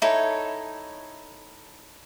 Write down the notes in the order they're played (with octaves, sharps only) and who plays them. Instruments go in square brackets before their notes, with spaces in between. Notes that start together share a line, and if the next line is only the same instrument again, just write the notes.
[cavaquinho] D#4 E4 A4 C#5